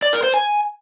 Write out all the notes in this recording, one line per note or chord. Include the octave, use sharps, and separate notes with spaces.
D5
A#4
C5
G#5